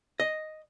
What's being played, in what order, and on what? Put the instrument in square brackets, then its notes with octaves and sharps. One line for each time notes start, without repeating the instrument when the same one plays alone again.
[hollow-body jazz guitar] D#5